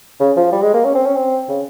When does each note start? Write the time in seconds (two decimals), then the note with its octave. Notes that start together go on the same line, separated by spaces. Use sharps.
0.20 C#3
0.37 F3
0.52 G3
0.62 G#3
0.74 A#3
0.84 C#4
0.95 C4
1.06 C#4
1.16 C4
1.49 C#3